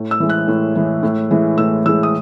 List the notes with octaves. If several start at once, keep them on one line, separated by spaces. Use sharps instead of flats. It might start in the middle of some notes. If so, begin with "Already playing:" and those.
Already playing: A2
E6
E3 G#3
F#6
A2
E3 G#3
A2
E3 G#3
A2 E6
E3 G#3 E6
D#6